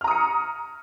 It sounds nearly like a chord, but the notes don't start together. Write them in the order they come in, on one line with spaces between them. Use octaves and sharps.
F6 A#5 D#6 C#7